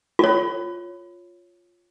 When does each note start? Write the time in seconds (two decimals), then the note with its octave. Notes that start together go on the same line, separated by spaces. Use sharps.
0.19 F4 C#5